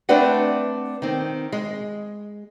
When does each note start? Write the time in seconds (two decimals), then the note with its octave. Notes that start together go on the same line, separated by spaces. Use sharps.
0.09 A3 C4 D4 B4 D5 F#5
1.02 D#3 C4
1.52 G#3